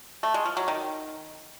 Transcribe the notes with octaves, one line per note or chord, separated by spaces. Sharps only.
A3
G#3
F3
F#3
D#3